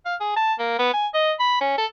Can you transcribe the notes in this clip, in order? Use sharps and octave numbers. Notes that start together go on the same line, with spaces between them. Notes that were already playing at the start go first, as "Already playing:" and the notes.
F5
G#4
A5
A#3
B3
G#5
D#5
B5
C#4
A4